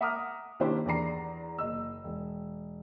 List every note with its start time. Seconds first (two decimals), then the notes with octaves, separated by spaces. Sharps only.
0.01 E5 F#5 A#5 D6 D#6 F6
0.60 D#3 A#3 D4 E4 G4 C5
0.86 E2 A#4 D5 A#5 C7
1.58 F#1 D#5 E6
2.04 E1